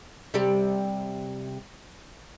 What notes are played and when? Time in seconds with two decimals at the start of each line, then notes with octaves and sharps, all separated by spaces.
0.34 C3 G3 G4